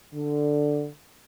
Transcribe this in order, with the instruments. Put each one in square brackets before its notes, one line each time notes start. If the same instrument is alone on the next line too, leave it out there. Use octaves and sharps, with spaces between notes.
[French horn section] D3